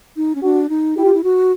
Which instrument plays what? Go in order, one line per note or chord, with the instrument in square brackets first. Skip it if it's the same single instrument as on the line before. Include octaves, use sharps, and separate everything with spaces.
[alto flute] D#4
C#4
[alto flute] D4 [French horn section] F#4
[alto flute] D#4
[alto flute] E4 [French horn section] G4
[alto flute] F4
E4
F#4